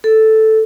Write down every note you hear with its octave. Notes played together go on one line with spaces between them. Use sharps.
A4